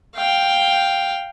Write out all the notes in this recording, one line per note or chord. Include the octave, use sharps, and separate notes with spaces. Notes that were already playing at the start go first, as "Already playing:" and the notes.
F5 G5